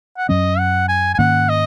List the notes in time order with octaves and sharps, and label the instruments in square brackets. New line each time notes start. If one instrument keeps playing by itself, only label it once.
[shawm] F#5
[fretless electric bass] F#2 F#3 C#4 [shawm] D#5
[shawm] F#5
G#5
G#5
[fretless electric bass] G#2 D#3 A#3 C#4 [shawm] F#5
[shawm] D#5